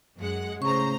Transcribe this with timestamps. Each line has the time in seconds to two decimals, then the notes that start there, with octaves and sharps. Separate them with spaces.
0.18 F#2 G#3 F#5
0.62 A2 C#3 C5 A#5 C#6